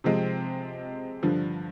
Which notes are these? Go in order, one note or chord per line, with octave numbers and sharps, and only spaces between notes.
C3 F3 G#3 C4
G2 D3 F3